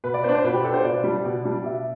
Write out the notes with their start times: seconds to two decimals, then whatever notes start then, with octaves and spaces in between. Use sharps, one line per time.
0.04 B2 B4
0.14 D5
0.24 B3 D4 C5
0.35 C5
0.44 B2 B4
0.54 G4
0.64 B3 D4 A4
0.74 C5
0.84 B2 D5
1.04 G3 D4
1.25 B2
1.44 G3 D4
1.64 B2 E5